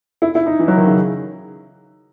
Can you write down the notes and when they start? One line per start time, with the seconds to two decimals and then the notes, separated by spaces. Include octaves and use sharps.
0.22 E4
0.35 E4
0.46 D#4
0.59 E3
0.68 F#3
0.77 D#3
0.86 C#3